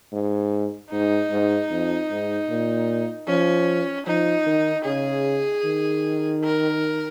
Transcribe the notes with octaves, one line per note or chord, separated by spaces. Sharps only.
G#2
G#2 D#4
G#2
F2
G#2
A#2
F3 C#4
F3 D#4
D#3
C#3 G#4
D#3
A#4